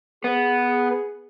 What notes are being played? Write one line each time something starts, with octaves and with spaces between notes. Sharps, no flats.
B3 G#4